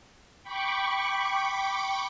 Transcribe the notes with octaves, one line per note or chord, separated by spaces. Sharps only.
G5 B5 C#6 D6